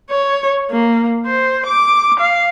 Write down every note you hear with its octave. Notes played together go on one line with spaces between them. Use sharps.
C#5
A#3
C5
D6
F5